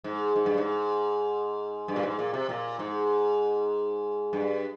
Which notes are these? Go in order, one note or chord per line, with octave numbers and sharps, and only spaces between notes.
G#2
G#2
G2
G#2
G2
A#2
G#2
A#2
C3
A#2
G#2
G2